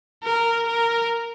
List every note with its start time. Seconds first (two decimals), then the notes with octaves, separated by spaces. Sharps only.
0.24 A#4
0.66 A#4